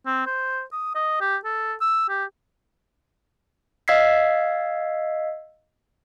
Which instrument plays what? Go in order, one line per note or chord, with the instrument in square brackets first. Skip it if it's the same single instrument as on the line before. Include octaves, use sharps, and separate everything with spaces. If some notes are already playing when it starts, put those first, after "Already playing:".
[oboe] C4
C5
D#6
D#5
G4
A4
E6
G4
[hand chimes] D#5 F5 E6 G#6 B6 C7